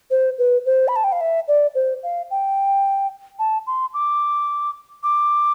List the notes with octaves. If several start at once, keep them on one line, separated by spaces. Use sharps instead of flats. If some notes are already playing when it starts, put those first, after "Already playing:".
C5
B4
C5
B5
A5
G5
F5
E5
D5
C5
F5
G5
A5
C6
D6
D6